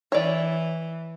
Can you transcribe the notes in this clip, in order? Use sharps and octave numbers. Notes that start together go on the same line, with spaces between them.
E3 C#5 D5